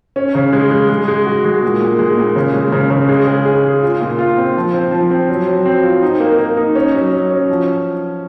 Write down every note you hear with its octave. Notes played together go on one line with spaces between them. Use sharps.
C#4
C#3
G#3
G#3
G#3
G#3
F#4
G#3
A#2
A#2
G#3
A#2
C#3
G#3
C#3
C#3
G#3
G#4
G#4
G#3
F4
A#2
F4
C4
F3
C4
F3
C4
F#3
F#3
C4
F4
D#4
A#3
A#3
D#4
C#4
F#3
F#3
C#4
F3